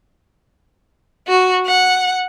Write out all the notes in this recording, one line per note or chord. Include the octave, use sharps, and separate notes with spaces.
F#4
F#5